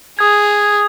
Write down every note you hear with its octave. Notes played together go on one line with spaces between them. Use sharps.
G#4 D#6 G#6